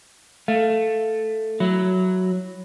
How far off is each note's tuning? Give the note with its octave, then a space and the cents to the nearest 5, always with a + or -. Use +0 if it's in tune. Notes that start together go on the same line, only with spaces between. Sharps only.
A3 +0 F5 -5
F#3 +0 E4 +0